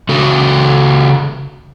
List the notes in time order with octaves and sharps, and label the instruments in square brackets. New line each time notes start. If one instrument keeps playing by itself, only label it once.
[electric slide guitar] C#3 F#4 A4